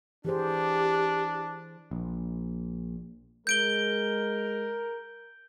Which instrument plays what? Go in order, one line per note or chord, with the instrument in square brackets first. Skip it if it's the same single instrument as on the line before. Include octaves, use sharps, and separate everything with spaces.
[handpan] E3 G#4 C5 [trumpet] D4 [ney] G4
[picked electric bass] A#1
[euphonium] G#3 [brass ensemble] A#4 [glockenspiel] G6 D7 G7